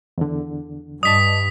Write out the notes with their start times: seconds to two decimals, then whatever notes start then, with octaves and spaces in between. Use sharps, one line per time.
0.18 E2 D3
1.03 G2 D5 D#5 A5 D#6 B6